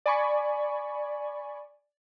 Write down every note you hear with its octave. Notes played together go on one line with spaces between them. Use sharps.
D5 G#5 B5 C#6